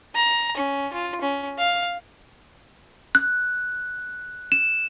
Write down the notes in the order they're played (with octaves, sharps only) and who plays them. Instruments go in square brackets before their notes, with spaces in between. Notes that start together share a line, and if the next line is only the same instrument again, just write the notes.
[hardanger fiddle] A#5
C#4
F4
C#4
F5
[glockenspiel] F#6
E7